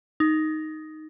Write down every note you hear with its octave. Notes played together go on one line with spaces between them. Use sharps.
D#4